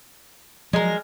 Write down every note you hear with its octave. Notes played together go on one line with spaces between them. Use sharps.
F3 F#3 G#3 A#4